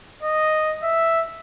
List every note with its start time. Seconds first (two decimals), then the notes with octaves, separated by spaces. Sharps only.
0.22 D#5
0.83 E5